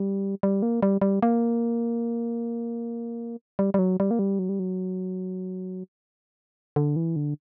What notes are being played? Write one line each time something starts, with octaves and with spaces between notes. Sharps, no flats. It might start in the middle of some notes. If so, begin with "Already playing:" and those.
Already playing: G3
G3
A#3
G3
G3
A#3
G3
G3
F#3
G3
A#3
G3
F#3
G3
F#3
D3
E3
D3